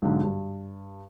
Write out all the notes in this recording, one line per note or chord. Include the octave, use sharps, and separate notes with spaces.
B1 G#2 D3
G2